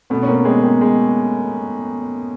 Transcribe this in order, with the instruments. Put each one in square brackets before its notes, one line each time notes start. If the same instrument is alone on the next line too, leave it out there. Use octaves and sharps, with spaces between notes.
[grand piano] B2 [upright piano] A3 B3
[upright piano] C#4
A#3 C4
[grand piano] G#3 [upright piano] A#3 C4
[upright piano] A#3 C4
[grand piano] G#3